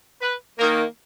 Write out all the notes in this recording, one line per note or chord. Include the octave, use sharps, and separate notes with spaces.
B4
D#3 A#3 A#4